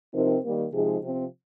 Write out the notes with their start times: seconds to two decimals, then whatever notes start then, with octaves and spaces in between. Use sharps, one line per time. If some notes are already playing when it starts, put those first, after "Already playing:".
0.13 C3 F3 C4 D#4 A#4
0.43 D#3 G3 A#3
0.72 C3 F3 G#3 D#4 G#4
1.01 C3 F3 C4